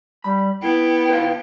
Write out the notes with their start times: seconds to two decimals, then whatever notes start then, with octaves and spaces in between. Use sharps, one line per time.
0.24 G3 B5
0.62 B3 E4 G5
1.09 B4 C5 F5